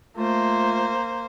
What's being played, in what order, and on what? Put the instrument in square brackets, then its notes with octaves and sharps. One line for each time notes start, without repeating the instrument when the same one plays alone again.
[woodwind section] A3 F4 [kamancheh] A#3 C5